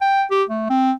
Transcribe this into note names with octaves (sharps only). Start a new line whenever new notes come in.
G5
G4
A3
C4